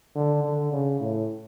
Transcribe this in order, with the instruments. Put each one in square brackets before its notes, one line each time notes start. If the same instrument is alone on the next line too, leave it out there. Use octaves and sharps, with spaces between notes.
[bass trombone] D3
D3
C#3
A2